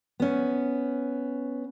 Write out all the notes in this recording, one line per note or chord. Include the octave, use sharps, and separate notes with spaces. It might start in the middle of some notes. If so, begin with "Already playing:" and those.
B3 C#4